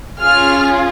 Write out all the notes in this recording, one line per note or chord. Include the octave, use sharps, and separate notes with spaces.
C#4 F4 G#4 F6